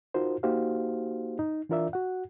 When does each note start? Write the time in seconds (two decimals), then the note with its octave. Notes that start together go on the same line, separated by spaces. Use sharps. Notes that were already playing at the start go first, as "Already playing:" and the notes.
0.14 D#4 F4 F#4 A#4 C5
0.43 A#3 D#4 F#4 G4 C5 F5
1.39 D#4
1.69 E3 D4 F4 A#4 D5 E5
1.93 F#4 F#5